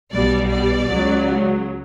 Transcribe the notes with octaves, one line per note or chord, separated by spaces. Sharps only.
B1 B2 G3 D5
D5
C#2 C#3 F#3